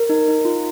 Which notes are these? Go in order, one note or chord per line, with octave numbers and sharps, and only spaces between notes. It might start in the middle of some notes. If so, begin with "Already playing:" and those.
Already playing: A#4
D#4
D#4
F4